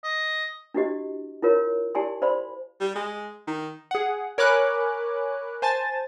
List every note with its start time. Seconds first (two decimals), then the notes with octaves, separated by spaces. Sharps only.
0.04 D#5
0.74 D4 E4 F#4 G4 D#5
1.42 E4 F4 A#4 C#5
1.95 E4 G4 D5 G#5 A5 C6
2.22 C5 D5 F5 B5 C6
2.80 G3
2.95 G#3
3.47 D#3
3.91 G#4 F#5
4.38 A#4 C#5 G#5 B5 D6 F#6
5.62 C5 G#5 A5 A6